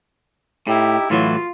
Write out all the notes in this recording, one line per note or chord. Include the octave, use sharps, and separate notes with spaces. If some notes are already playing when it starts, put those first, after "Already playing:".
A2 D#4 E4 G4
A2 E3 F#3 F4